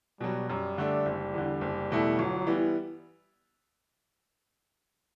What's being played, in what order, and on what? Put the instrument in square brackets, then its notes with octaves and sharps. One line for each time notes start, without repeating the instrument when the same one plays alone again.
[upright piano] B2 F#3 [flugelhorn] G3
[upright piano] F#2 [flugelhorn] G3
[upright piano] D3 A3 D4
F#1
E2 D3
F#1
E2 B2 A3 E4
[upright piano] G1 [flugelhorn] F#3
[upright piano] E3 G3 B3